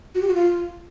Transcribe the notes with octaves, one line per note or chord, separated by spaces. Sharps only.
F#4
G4
F#4
F4